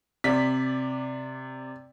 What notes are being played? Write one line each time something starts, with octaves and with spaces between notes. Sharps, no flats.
C3 D5 B6